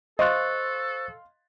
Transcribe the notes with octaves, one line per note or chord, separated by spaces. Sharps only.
A4 C5 D#5 F5 C6 C#6 F#6 A6